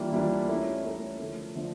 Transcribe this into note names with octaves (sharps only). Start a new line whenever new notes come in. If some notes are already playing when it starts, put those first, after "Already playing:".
Already playing: E3 G3 A#3 D4 F4
E3 G3 A#3 D4 F4
A3 C#4 E4 A#4
A3 C#4 E4 A#4
D3 F3 A3
D3 F3 A3